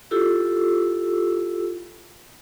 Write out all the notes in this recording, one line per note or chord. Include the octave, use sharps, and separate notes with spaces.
E4 F4 G4 A4 E6